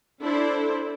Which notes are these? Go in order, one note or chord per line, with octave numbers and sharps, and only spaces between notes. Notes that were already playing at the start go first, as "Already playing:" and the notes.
D4 E4 A4 C5